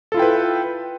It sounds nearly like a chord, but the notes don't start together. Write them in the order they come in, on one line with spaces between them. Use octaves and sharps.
A4 F4 E4 G5 B4